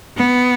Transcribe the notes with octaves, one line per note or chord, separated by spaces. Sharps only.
B3